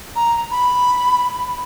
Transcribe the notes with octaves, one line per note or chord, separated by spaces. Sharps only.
A#5
B5